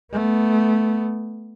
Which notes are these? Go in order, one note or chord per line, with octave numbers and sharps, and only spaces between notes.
A3 B3